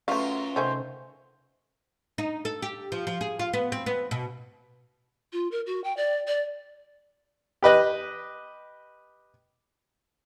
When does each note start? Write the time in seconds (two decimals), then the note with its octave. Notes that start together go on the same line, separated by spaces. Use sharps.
0.08 F#2 F#3 A3 C#4 F4 B4 E5 F5
0.56 C3 D#3 A3 C#4 C5
2.18 D#4
2.45 A4
2.62 G4
2.92 F3
3.07 F3
3.21 G#4
3.39 F4
3.53 B3
3.72 C4
3.86 B3
4.11 B2
5.33 F4
5.52 A#4
5.66 F#4
5.84 G5
5.97 D5
6.27 D5
7.63 G4 B4 D#5 F#6